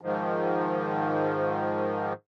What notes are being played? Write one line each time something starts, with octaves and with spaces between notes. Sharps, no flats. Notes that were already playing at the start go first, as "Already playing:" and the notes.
G#2 D#3 F3